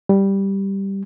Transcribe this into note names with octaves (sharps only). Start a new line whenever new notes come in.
G3